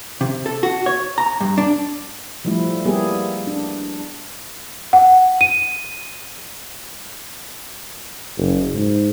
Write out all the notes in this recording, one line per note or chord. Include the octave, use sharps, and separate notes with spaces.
C3
A4
F#4
C#5
A#5
G2
D4
F3 G3 A3 E4
G3 A#3 B3 E4 G4 G#4
D4
F#5
D#7
F#1
G#2